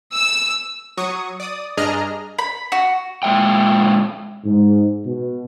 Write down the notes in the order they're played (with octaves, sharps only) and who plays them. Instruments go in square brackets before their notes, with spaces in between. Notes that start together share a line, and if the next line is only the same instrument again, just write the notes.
[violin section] E6
[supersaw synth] F#3 C#6 D#6
D5 D#6
G2 D4 G#4 D#5 A#5 F6
[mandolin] B5
F#4
[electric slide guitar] A#2 G#3 E5 G5
[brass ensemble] G#2
B2